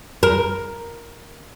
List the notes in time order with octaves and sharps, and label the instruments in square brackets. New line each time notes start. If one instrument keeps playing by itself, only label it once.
[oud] A#4